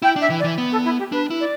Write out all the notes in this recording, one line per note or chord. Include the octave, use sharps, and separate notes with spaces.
E4 G5
D4
E5
E3
D5
E3
B3
A4
E4
G4
D4 B4
E4
D5